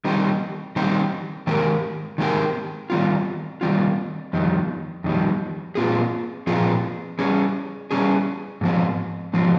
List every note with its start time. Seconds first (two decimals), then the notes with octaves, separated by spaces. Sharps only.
0.05 D#3 G3 C4 G4
0.76 D#3 G3 C4 G4
1.47 D#3 G#3 C4 G4 A#4
2.18 D#3 G#3 C4 G4 A#4
2.90 D#3 G3 C4 F4
3.61 D#3 G3 C4 F4
4.33 F2 D#3 G3
5.04 F2 D#3 G3
5.75 A#2 F3 C4 F4 G#4
6.47 A#2 F3 C4 F4 G#4
7.19 G3 C#4 G#4
7.91 G3 C#4 G#4
8.61 G#2 F3 C4
9.33 G#2 F3 C4